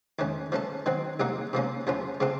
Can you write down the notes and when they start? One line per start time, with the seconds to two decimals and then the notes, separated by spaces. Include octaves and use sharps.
0.19 F2 D#3 A3 C#4
0.52 F3 A3 C#4 A4
0.86 D#3 F#3 C4
1.20 C2 C3 F#3 A#3 D#4
1.53 C3 F3 A#3 C#4
1.87 F#2 F3 A3 C#4 F4
2.20 C#3 A3 C4 F4 A4